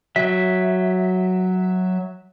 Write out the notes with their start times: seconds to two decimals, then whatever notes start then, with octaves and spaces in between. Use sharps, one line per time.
0.16 F#3 E5